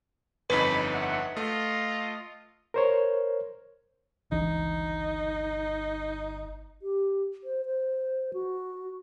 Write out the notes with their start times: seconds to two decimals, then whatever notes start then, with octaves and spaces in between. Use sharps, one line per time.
0.50 G1 F2 D#4 B4 B5
0.94 E5 F#5
1.37 A3 F4 D#5
2.74 A#4 C5 C#5
4.32 G1 C#2 E3 D4 D#4
6.82 G4
7.44 C5
7.66 C5
8.33 F#4